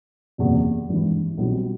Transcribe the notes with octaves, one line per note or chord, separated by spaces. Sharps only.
F#1 E2 C3
G#1 G2 E3
B1 B2 G3 C4 F4